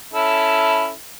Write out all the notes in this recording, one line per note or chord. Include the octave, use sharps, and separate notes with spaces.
C#4 E4 A4